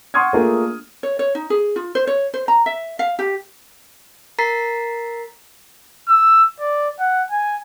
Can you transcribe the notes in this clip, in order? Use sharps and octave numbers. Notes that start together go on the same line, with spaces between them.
F#5 C6 C#6 D#6 F6 G#6
A3 A#3 D4 F4 G#4 A#4
C#5
C#5
D#4
G#4
F4
C5
C#5
C5
A#5
E5
F5
G4
A#4 A#5 A6 B6 C7
E6
D5
F#5
G#5